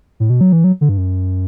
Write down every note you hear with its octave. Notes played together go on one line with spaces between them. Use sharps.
A2
B2
F#3
E3
F#3
D3
G2
F#2